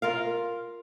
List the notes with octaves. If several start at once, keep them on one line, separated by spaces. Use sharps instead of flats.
F4 A#4 F5